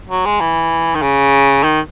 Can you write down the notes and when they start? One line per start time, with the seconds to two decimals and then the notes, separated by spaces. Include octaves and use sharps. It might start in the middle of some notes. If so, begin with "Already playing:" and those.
0.09 F#3
0.26 G#3
0.41 E3
0.95 D#3
1.02 C#3
1.63 D#3